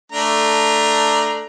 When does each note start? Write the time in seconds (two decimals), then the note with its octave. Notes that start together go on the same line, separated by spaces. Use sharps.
0.12 A3 D4 A#5